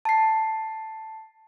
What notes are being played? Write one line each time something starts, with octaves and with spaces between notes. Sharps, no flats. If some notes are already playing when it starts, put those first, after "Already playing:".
A5 C7